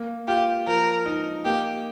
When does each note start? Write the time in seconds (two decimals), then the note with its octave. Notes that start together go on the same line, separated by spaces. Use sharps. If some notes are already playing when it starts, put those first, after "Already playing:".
Already playing: A#3
0.28 F4 G4
0.67 F3 A#4
1.06 D#4
1.45 A#3 G4